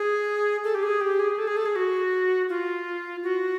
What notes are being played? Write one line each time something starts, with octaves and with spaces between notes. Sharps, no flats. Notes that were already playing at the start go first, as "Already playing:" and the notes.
Already playing: G#4
A4
G4
G#4
G4
G#4
A4
G#4
A4
G#4
F#4
F4
F#4